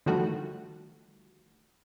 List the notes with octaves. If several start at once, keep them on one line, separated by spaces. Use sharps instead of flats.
D3 D#3 F3 G3 A3 F#4